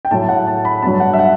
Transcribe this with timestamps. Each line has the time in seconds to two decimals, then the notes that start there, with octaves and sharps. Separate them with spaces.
0.05 G5
0.11 A2 F#3 A5
0.29 F#5
0.47 A5
0.65 B5
0.82 G2 F#3 A5
1.00 F#5
1.13 E5
1.19 F#5